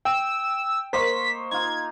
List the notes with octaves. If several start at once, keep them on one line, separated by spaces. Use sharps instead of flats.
G5 E6
A#3 C5 D#5 C6 C#6 B6
D#4 F4 G#6